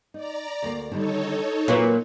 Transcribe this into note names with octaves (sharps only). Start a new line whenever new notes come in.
D#4 D5 A#5
D2 A#3
D3 D#3 G3 D#4 A4 C#5
A#2 F#3 A#3 C4 B4